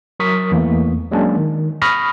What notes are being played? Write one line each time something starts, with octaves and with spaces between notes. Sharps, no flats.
F#3 A#4 C#6 D#6 B6
E2 E3 A3 A#3
F#3 G#3 A#3 C#4 D4
D#3
B5 C#6 D#6 F6 A#6